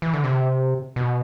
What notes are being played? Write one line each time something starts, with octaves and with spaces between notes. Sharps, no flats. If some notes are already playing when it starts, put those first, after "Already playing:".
E3
D3
C3
B2